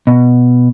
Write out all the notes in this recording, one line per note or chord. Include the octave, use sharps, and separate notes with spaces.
B2